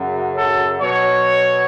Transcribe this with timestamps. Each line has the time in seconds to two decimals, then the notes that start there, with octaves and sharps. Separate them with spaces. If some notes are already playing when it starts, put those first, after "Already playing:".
Already playing: F#2 C#3 F#3
0.35 A4
0.80 B2 F#3 C#5